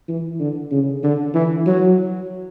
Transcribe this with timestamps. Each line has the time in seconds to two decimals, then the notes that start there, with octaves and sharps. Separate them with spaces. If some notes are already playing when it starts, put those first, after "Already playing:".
0.08 E3
0.39 D3
0.71 C#3
1.03 D3
1.34 E3
1.67 F#3